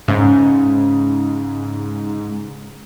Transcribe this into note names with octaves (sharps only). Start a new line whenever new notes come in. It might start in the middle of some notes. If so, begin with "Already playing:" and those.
G#2 C#3